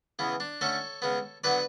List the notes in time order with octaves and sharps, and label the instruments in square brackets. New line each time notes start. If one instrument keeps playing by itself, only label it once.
[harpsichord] C#3 E3 B3
D4
D3 A3 C#4 A4 C#5
C#3 G#3 B3
D3 F#3 B3 B4 D5